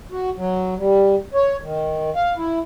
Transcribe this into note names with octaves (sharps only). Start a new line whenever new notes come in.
F#4
F#3
G3
C#5
D#3
F5
E4